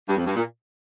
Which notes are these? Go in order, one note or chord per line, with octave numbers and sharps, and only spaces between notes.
G2
F2
G2
A#2